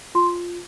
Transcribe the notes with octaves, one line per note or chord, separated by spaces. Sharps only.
F4 C6